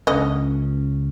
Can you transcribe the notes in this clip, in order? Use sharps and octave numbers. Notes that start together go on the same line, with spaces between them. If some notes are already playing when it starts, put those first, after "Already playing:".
C#2 D3 C#4 D#5